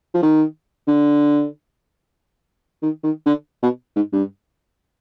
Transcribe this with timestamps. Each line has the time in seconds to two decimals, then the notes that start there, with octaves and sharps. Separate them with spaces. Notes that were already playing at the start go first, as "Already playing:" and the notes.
0.14 F3
0.23 D#3
0.88 D3
2.83 D#3
3.04 D#3
3.26 D3
3.63 B2
3.96 G#2
4.13 G2